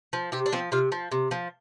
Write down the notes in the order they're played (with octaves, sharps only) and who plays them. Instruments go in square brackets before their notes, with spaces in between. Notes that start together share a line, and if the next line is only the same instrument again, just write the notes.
[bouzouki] F3
C3 G4
D4
F3 C4
C3 F4
F3
C3
F3